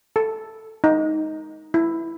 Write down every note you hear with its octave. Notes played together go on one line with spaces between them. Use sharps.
A4
D#4
E4